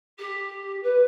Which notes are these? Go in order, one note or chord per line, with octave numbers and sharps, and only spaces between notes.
G4
B4